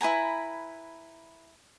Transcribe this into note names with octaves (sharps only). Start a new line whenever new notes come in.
E4 B4 G#5 A#5